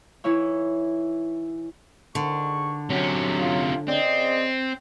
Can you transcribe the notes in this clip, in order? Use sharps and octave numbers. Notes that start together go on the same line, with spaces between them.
E3 D#4 E4 C#5
G#2 D3 D#3 C#6
C3 F#3 C#4
F4
C#3 C4 D5 D#5